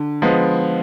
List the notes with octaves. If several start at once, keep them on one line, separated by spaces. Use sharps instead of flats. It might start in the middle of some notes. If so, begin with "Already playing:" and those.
Already playing: D3
F3 G#3 B3